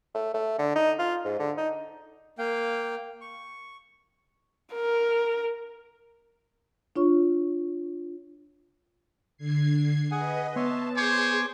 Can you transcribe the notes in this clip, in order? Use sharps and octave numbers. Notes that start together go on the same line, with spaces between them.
A3
A3
D3
D#4
F4
G#2
D3
D#4
A#3 F5 G5
C#6
A#4
D4 F4 C#5 C#6
D3 G#6 C7
G#4 B4 D#5 F#5 G#5
B3 C#5 E5 A5 C6
G#4 C5 C#5 G#5 C6 D6